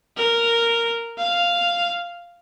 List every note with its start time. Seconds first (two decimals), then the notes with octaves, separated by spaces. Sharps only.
0.17 A#4
1.18 F5